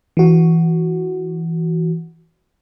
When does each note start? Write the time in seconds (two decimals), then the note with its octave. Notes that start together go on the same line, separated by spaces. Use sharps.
0.17 E3 F#4